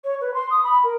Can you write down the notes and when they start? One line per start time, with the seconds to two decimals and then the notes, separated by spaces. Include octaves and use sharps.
0.04 C#5
0.21 B4
0.34 C6
0.50 D#6
0.63 B5
0.83 A#4